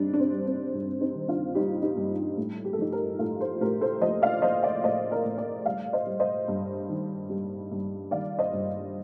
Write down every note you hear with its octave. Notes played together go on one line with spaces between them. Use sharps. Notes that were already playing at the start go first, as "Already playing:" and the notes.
Already playing: G2 G3 C4 D4 D#4
D4
C4
G3
C4
G2 D4
C4 D#4
D#3
D4 F4
G3 D#4 G4
D#4 G4
G2
A2
G4
A4
F3 D#4 G4
G4 A#4
A2 F4 A4
A4 C5
A2 G4 A#4
A4 C5
F3 C5 D#5
D5 F5
F3 C5 D#5
D5 F5
A2 C5 D#5
A#4 D5
A2
A#4 D5
G3 D5 F5
C5 D#5
G3
C5 D#5
G2
D#3
G3
G2
D#3 D5 F5
C5 D#5
G2